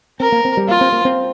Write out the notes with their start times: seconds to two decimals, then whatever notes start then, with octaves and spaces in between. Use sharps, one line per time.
0.20 C4 A#4
0.32 A#3
0.45 C4
0.57 G3
0.69 A#3 F4
0.81 C4
0.92 A#3
1.05 C4